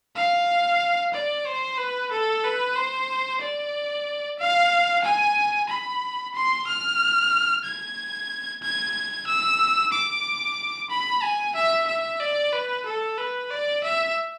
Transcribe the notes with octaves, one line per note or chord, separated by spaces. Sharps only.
F5
D5
C5
B4
A4
B4
C5
D5
F5
G#5
B5
C6
F6
G#6
G#6
E6
D6
B5
G#5
E5
E5
D5
B4
A4
B4
D5
E5